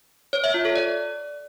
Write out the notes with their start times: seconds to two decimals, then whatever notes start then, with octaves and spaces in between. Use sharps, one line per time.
0.33 C#5
0.44 E5
0.54 F4
0.65 A4
0.76 D5